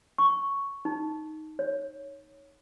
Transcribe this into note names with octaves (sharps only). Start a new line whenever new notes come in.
C#6
D#4
C#5